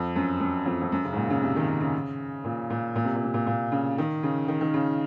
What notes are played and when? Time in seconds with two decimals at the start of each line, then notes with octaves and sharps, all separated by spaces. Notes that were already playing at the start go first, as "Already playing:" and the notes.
Already playing: F2
0.16 F#2
0.40 F#2
0.66 F2
0.82 F2
0.92 F#2
1.05 C#3
1.13 G#2
1.17 A#2
1.30 C#3
1.42 C3
1.56 D#3
1.68 D#3
1.80 C#3
2.45 A#2
2.70 A#2
2.96 A#2
3.05 C3
3.15 A#2
3.24 C3
3.34 A#2
3.47 A#2
3.72 C#3
3.98 D#3
4.23 C#3
4.48 D#3
4.61 D#3
4.74 C#3